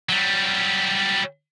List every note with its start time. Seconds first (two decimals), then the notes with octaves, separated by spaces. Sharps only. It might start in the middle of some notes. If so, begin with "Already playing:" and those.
0.09 F#3 G3